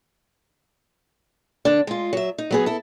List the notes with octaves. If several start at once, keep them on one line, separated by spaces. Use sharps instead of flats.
D3 D4
G#3 F4
F#3 E5
D#4
F#3 B3 G#4
E4 A4